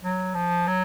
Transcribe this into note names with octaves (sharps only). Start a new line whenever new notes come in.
F#3
F3
F#3